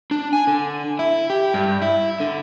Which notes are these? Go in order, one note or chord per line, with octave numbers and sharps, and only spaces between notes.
D4
G#5
D3
E4
G4
G2
E4
D3